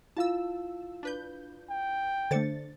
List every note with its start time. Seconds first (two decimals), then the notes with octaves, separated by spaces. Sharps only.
0.17 E4 F4 F5 A5 E6
1.03 D4 B4 G6
1.70 G5
2.31 D3 A3 D4 C5 A6 C#7